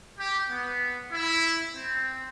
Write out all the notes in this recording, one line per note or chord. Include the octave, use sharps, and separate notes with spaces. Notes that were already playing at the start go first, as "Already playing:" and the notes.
G4
B3
E4
C4